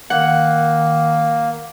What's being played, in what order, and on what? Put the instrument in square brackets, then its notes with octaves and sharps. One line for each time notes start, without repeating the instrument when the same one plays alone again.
[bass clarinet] D#3 [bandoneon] A#3 [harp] F#5